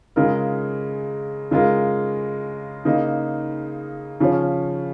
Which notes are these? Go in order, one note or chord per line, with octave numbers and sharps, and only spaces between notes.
C#3 G#3 F4 A#4
C#3 G#3 F4 A#4
C#3 A#3 D#4
C#3 F3 C#4